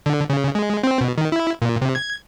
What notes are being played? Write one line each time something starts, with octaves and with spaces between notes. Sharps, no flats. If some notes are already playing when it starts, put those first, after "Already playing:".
D3
C#3
G#3
C4
B2
D#3
E4
A#2
C3
G#6